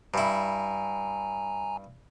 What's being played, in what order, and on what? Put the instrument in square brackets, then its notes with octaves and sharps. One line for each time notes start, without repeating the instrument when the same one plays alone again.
[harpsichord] G2 E4 [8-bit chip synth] G#5 A#5